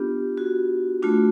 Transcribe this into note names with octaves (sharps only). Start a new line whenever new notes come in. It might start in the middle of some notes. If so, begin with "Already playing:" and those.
Already playing: B3 D4 F4 G4
F#4
A3 D4 F4 F#4